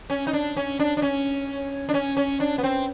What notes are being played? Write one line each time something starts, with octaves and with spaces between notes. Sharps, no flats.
C#4
D#4
D4
C#4
D4
D4
C#4
D4
C#4
C#4
D4
B3
C4